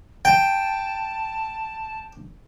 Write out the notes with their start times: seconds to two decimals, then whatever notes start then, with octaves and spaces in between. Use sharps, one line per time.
0.25 G5 A5